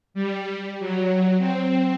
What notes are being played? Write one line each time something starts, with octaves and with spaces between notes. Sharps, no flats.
G3
F#3
C4